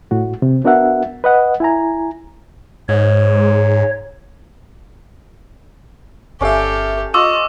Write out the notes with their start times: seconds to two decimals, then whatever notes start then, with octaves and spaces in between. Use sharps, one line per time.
0.11 A2 F#4
0.42 C3
0.64 B3 D4 F#4 A#4 E5 F#5
1.24 B4 D#5 F#5
1.60 E4 G#5 A#5
2.89 G#2 C#5
6.41 G1 C#4 G4 A4 D5 E5 F5
7.14 F4 D#5 C#6 D6 E6